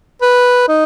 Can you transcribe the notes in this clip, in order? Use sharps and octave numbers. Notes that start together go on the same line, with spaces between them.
B4
D#4